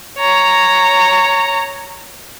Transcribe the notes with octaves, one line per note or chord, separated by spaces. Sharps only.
C#5 A#5